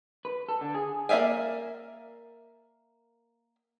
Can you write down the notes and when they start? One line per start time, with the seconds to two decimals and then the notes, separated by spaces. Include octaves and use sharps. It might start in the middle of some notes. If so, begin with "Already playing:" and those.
0.25 B4
0.49 A4
0.61 D3
0.75 G#4
1.09 A#3 D5 E5 F5 G#5